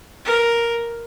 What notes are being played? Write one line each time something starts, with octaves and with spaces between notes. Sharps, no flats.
A#4